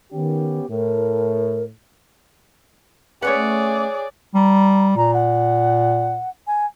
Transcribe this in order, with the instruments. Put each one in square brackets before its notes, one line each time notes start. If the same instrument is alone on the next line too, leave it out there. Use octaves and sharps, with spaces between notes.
[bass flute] D#3 [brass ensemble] B3 C#4 G4
[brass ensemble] A2 [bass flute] A#4
[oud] A3 C#4 B4 [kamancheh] G#4 D5 [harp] C#5 F#5
[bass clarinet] G3 [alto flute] A#5
[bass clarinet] A#2 [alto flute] A#5
[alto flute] F#5
G#5